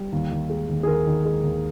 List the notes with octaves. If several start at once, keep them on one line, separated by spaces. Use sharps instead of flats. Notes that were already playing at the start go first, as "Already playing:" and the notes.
Already playing: G3
D#2
D#3
G#3
D#2
G#4
D#2 A#4
D#3
G#3
D#2